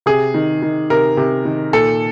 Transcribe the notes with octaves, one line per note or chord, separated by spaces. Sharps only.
C3 G#4
D#3
D#3
C3 A#4
C3
D#3
A#2 A4